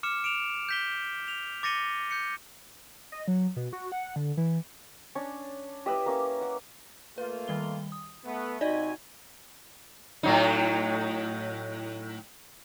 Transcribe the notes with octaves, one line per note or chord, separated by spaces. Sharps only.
D6 F6 C#7 E7
D7 E7 F7
G6 B6 G7
F7
D6 A6 A#6 C#7 D#7 G7
G6 C#7
D#5
F#3
B2
F#4
F#5
D3
E3
C#4 D4 C#5
E4 G4 B4 D#5 E5
A#3 C#4 D6
F#5
A3 A#3 F4 B4
D#3 G3 G7
D#6
A3 B3
C3 D#4 F#4 D5 D#5 G#5
A2 F#3 D#4